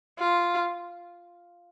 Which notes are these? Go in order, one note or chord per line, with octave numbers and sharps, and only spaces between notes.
F4